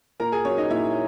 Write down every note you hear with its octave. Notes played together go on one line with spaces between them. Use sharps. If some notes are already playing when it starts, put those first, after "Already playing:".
A#2 A#4 A#5
G#4 G#5
F#3 C#4 C#5
D#4 D#5
A#2 E4 E5